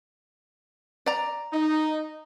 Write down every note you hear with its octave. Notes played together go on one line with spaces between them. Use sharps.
D5 A#5
D#4